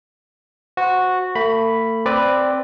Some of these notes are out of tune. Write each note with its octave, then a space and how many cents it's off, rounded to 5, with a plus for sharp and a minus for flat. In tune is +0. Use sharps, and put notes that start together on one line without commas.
F#4 -10 C5 -15
A3 +40 B5 +0
C4 +0 B4 +5 D5 +0